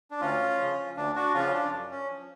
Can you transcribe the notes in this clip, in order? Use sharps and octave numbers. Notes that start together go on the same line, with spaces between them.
D4
D2 C#4 F4
C#3 F3
D2 D4
D4 F#4
C#3 F3 C#4 F4
D4
F#2
C#4
F3